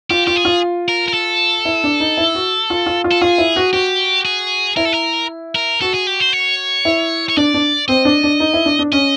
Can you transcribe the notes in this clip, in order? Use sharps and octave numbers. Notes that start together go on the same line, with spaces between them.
F4 G4
F4 G4
G#4
F4
A#4
A#4
A4
E4
D4
D#4
E4
F#4
F4
F4
F4
A4
F4 G#4
E4
F#4
F#4 G4
G#4
E4 A#4
A4
A#4
A#4
F#4 A4
G#4
G4
C5
C#5
E4
C#5
D4 D5
D4
C4 D#5
D4
D4
D#4
E4
D4
D4
C#4 D#5